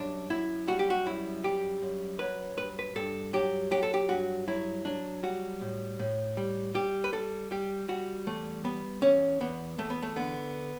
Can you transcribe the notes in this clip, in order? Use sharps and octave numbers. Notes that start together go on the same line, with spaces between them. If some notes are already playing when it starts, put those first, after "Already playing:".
Already playing: F#2 G3 D4
F#2 E4
G3 F#4
G4
F#4
F#2 E4
G3 G4
F#2
F#3 B4
G2 B4
B4
G2 A4
F#3 G4
F#3 G4
A4
G4
G2 F#4
F#3 E4
F#3 D4
G3 F#4
A2
A2
G3
G3 G4
B4
G3 A4
G3 G4
G3 F#4
E2 A3
G3 B3
E2 C#4
E2 B3
E2 A3
B3
A3
D3 B3